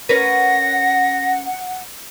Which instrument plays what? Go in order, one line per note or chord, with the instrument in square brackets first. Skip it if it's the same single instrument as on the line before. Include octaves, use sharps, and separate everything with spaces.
[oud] C#4 A#4 B4 [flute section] F#5 [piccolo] A#6